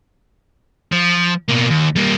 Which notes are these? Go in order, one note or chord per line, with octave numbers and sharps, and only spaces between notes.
F3
B2 A#3
D#2
G3 A#3